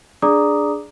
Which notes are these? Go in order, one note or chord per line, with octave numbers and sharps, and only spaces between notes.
D4 G#4 D5 A#5 D6 D#6